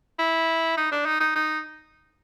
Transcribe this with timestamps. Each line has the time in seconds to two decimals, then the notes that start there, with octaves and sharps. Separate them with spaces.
0.19 E4
0.77 D#4
0.92 D4
1.06 D#4
1.21 D#4
1.36 D#4